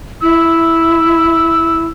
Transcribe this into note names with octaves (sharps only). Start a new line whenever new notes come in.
E4 E6